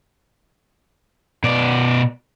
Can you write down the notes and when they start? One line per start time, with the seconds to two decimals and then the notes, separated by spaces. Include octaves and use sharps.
1.44 B2 D5